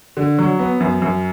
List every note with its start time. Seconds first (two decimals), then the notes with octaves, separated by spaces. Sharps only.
0.17 D3
0.38 F#3
0.59 B3
0.80 F#2
1.02 F#2